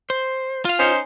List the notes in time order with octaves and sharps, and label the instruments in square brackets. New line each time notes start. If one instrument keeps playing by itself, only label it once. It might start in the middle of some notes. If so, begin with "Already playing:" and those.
[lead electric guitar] C5
F4 F5
[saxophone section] C#4 D#4 C5